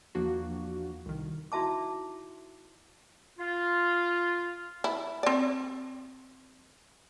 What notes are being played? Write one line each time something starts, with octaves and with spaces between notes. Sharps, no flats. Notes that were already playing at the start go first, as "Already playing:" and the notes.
E2 F3 A#3 D4 F#4
C2 D#3
D#4 E4 F#4 E5 A5 D6
F4
E4
C4 D5